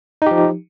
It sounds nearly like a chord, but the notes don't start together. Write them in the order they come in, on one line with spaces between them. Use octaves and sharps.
D#4 G4 F3